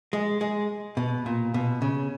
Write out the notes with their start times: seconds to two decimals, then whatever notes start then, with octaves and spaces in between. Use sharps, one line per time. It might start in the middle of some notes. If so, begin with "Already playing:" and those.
0.13 G#3
0.41 G#3
0.97 B2
1.26 A#2
1.54 B2
1.82 C#3